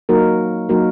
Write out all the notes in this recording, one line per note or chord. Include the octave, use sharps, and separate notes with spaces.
F#3 A#3 D#4 F#4 A#4
F#3 A#3 D#4 F#4 A#4